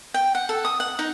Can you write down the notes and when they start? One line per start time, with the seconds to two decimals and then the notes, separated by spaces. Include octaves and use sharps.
0.14 G5
0.35 F#5
0.49 A4
0.65 D#6
0.80 F#5
0.99 D#4